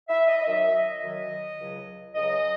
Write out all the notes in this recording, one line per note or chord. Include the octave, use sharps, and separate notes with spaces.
E5
D#5
D#5
F#2 D#3 F#3 E5
D#5
F#2 D#3 F#3
C#2 C#3 F#3
C#2 C#3 F#3 D#5